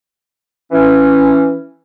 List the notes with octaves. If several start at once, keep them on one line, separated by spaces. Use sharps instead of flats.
E3 C#4